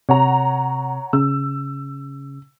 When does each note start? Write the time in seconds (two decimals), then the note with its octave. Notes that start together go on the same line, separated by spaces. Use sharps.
0.09 C3 C#5 F#5 A#5
1.13 C#3 E6